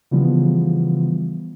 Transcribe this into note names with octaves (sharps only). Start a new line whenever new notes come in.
C#3 E3 F3 G3 B3